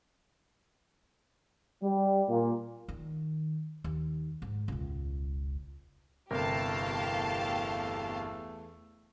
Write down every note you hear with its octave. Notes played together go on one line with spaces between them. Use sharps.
G3
A#2
D#3
D#2
G#2
E1 C#2
G1 E2 C3 A3 G4 A#4 F5 A5